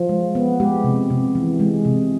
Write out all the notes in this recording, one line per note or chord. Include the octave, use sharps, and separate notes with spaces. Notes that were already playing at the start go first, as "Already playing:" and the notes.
Already playing: F3
G#3
B3
G#3 G4
C3
C3
E3
G#3
C3